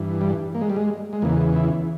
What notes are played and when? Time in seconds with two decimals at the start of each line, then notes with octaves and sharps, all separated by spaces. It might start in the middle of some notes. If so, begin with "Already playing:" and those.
Already playing: G2 E3
0.21 G3
0.55 A#3
0.61 G#3
0.70 G3
0.76 G#3
1.13 G#3
1.22 E2 C#3 E3 A#3
1.56 E4